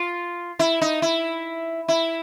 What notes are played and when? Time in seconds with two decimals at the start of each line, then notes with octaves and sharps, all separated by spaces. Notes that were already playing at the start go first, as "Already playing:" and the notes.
Already playing: F4
0.59 E4
0.81 D#4
1.02 E4
1.88 E4